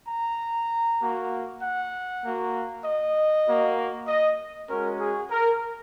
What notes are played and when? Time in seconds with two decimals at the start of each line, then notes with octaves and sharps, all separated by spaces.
0.08 A#5
1.00 A#3 F#4
1.62 F#5
2.23 A#3 F#4
2.85 D#5
3.47 A#3 F#4
4.08 D#5
4.70 G#3 C#4 F#4 A#4
5.00 G#4
5.31 A#4